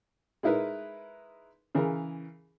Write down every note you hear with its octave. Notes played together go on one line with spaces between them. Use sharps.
G#3 D#4 E4 A#4 B4
C#3 E3 G#4 A#4